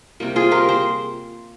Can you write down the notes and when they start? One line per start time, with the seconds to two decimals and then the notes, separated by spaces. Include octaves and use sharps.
0.20 C3 G3 A#3
0.36 F4 G#4
0.51 G4 A#4
0.69 G#4 C5